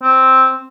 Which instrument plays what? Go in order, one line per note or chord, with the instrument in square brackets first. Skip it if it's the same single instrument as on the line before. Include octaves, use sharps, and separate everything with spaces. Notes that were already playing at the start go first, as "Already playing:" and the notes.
[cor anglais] C4